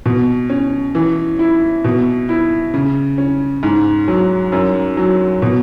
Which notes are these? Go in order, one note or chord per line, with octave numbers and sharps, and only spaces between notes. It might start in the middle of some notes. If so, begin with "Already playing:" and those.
B2
C#4
E3
E4
B2
E4
C#3
C#4
G#2
F#3
F#2
F#3
B2